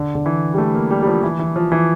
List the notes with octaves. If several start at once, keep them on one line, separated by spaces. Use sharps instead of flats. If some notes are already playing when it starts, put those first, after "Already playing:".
Already playing: D3
D3
E3
G3
A3
A#3
G3
G3
F3
E3
E3
F3
E3